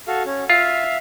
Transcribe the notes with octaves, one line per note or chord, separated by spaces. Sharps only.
F#4 A4 F5
C#4
F4 E5 F5